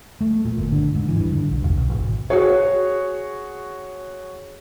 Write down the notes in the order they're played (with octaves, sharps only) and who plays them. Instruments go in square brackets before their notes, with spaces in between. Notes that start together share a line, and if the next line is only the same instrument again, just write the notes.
[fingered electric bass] A3
A#2
G1
D3
G#2
E3
G2
D3
A#1
E1
B1
G#1
[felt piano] F#4 G#4 C#5